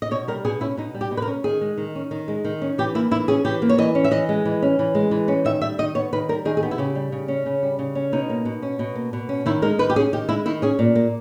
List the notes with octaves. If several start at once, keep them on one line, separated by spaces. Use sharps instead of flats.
D#5
B2 C#5
G3 A#4
B2 G#4
C#4 E4
B2 D#4
G3
G4
B2
B4
A#4
C#4
D#3 G#4
G#3
D#3
C#4
D#3
G#3
D#3
C#4
E3 G4
A#3 E4
E3 E4
C#4 G#4
E3 G4
A#3
C#5
E3 D#5
C#4
E5
E3 D#5
G#3
E3
C#4
E3
G#3
E3
C#4
D#3 E5
G3 E5
D#3 D#5
B3 C#5
D#3 B4
G3 A#4
D#3 G#4
G#4
B3 G4
E4
C#3 G4
G3
C#3
C#4
C#3
G3
C#3
C#4
B2 D#4
A#3
B2
C#4
B2
A#3
B2
C#4
D#3 E4
G#3 A#4
D#3 B4
G4
C#4 G#4
D#3 G4
G#3 E4
D#3 E4
C#4 G#4
A#2
A#3